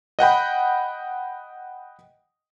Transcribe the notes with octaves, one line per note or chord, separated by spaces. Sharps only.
D#5 F#5 G5 B5